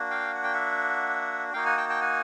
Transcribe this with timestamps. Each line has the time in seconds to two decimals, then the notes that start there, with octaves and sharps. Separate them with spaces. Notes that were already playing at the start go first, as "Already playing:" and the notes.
Already playing: A#3 D4 F#4
0.10 F5 G5
0.35 F#5
0.43 G5
0.53 E5 F#5
1.53 A#3 D#4 F#4 F5 G5
1.66 F#5 G#5
1.77 G5 A5
1.89 G5 A5
2.01 F#5 G#5